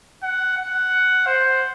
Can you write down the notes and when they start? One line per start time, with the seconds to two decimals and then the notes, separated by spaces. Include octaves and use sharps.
0.23 F#5
0.57 F#5
1.26 C5